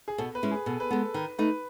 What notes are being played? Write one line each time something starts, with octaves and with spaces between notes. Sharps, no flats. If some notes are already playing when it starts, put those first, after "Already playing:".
G#4
B2 A4
B4
G#3 C#4 E4
G#4
B2 A4
B4
G#3 B3 A4
D#3 B4
A3 D#4 B4